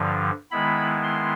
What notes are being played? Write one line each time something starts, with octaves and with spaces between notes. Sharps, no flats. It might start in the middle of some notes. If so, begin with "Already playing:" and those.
Already playing: G2 D3 F3
D#3 G#3 B3 E4 B5
C6